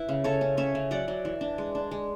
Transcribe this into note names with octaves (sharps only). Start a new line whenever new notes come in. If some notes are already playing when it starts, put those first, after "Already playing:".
Already playing: E4 B4
C#3
C#3 A4 C#5
C#4
C#4 C#5 E5
C#3
F#3 D5 F#5
F#3
E3
D4
G#3
D4
G#3